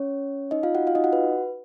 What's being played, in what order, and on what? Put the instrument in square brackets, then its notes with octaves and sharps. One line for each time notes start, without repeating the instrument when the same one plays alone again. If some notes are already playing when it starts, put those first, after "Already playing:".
Already playing: [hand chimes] C#4 C#5
D#4 D#5
F4 F5
F#4 F#5
F4 F5
D#4 D#5
F#4 F#5
B4